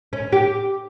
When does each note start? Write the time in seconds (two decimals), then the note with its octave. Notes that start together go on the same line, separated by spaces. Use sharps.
0.13 C#4
0.32 G4